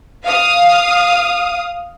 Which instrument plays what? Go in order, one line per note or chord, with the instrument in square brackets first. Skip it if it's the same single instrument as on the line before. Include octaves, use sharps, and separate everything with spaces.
[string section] F5 D#6